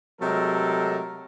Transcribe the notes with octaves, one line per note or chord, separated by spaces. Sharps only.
C3 F#3 G#3 A3 A4 A#4